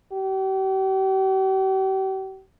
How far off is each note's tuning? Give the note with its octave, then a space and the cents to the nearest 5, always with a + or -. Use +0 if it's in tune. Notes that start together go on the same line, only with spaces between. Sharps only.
G4 -40